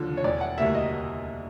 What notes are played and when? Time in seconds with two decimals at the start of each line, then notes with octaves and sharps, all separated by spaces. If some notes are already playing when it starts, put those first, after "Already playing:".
Already playing: D#2 D3 F3
0.17 C#5
0.24 E1 D5
0.41 F#5
0.58 D2 D3 G3 A#3 E5
0.75 D#5